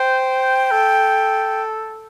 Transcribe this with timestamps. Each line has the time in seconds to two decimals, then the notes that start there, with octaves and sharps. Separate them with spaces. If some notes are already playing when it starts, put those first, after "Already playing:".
Already playing: C5 G5
0.71 A4